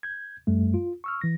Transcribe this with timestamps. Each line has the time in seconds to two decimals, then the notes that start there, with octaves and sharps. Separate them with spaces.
0.03 G6 G#6
0.47 F#2 G3 A3
0.74 F4
1.04 C#6 E6 F6
1.21 E3 A#6